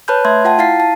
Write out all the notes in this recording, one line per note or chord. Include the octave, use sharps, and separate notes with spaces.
B4 C#5 A5 B5 F#6 G6
A3 E5 C6 G#6
F4 F#5 G5 A5
E4 F5 A6 C7
A5